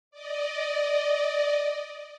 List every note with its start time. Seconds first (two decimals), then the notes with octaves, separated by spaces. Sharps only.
0.11 D5 D#5